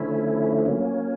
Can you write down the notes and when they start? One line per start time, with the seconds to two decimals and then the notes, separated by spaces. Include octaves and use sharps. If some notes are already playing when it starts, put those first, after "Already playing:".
Already playing: D3 F3 A3 C#4 E4
0.66 F#3 A#3 C#4